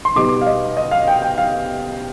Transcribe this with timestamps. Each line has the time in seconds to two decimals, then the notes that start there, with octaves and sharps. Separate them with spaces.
0.05 C6
0.16 B2 G3 B3 D#4 D6
0.41 F5
0.47 D#5
0.77 D#5
0.91 F5
1.07 G5
1.22 G5
1.38 F5